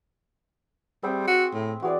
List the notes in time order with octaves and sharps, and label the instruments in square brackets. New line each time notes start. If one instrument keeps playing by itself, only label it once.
[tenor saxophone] G3 [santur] C4 G#4 E5
[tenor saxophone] F#4
A2
[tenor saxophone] E3 [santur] F#4 G#4 D5